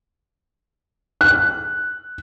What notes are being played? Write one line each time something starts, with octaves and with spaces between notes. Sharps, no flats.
F#6